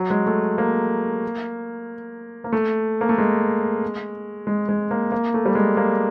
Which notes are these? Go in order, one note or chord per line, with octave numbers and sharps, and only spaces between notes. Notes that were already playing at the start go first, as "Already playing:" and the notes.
Already playing: F#3
G#3
A3
A#3
A#3
A3
A#3
A3
G#3
G#3
G#3
A#3
A#3
A3
G3
G#3
A#3